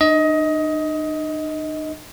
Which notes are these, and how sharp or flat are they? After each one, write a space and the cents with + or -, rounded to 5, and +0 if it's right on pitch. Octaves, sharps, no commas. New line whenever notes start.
D#4 -45 D#5 +20